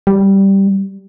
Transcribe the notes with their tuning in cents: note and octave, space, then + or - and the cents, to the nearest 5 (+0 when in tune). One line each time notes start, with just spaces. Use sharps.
G3 -5